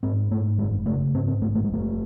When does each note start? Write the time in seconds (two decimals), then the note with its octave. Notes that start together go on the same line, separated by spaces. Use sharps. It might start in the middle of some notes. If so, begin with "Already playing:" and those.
0.03 G#2 C4
0.31 G#2 A3
0.58 F#1 G#3
0.86 C#3 A3
1.14 G#2 C4
1.28 C4
1.41 G#1 A3
1.55 A3
1.64 G#3
1.69 F#1 A3